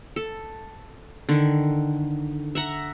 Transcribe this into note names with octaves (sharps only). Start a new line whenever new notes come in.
A4
D3 D#3
E5 F#5 A#5